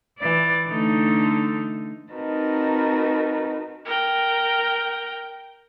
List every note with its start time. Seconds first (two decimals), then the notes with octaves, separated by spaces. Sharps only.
0.19 E3 D5
0.67 D3 A3 D#4
2.13 C4 D#4 F#4 A#4 B4 A5
3.86 A#4 G5